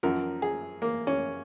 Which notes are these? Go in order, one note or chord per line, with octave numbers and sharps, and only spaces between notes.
F#2 F3 A#4
G#4
A#3
C#4